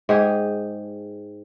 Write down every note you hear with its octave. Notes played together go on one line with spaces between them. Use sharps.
G#2 G4 G#4